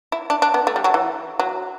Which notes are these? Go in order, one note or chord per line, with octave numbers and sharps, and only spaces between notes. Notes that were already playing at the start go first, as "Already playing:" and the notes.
E4
D4
D4
B3
A3
G3
F#3
E3
F#3